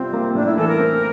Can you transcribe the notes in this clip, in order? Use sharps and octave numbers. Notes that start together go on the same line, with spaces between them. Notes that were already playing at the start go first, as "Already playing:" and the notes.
Already playing: C3 G3 C4 F4
A#3
A2 D4
E4
E3 A4
A#4
C4